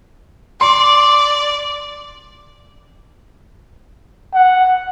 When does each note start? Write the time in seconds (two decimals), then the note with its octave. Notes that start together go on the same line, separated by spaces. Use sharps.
0.61 D5 C6
4.34 F#5